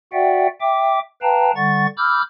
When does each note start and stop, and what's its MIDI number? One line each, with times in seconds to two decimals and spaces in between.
0.13 0.47 66
0.13 0.47 74
0.13 0.47 76
0.13 0.47 78
0.13 0.47 79
0.60 0.99 76
0.60 0.99 79
0.60 0.99 86
1.22 1.51 71
1.22 1.51 77
1.22 1.51 79
1.22 1.51 81
1.22 1.51 82
1.56 1.86 50
1.56 1.86 55
1.56 1.86 78
1.56 1.86 85
1.56 1.86 93
1.97 2.21 83
1.97 2.21 86
1.97 2.21 88
1.97 2.21 89
1.97 2.21 91